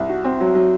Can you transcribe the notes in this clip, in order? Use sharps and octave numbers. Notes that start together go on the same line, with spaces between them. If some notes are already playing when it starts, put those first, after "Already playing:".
Already playing: C2
F#4
C4
F#3
F#3